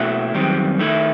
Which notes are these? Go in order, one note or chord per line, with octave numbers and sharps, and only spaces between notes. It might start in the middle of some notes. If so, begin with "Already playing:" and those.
Already playing: B2 A3 E4 F#4
F#2 D#3 G3 C4
D#3 A3 E4